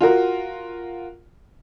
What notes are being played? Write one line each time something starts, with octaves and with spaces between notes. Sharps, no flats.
F4 F#4 A#4